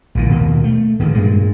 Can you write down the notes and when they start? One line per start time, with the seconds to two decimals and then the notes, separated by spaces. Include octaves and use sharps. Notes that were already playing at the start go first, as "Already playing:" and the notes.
0.15 A#1 A#2 E3
0.29 D#2 B2 A#3
0.64 A3
0.99 B2 D#3 E3 G#3
1.13 G2 A#2 G#3